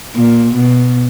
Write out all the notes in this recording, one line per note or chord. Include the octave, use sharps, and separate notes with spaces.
A#2
B2